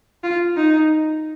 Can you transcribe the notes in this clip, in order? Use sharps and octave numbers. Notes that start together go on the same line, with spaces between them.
F4
D#4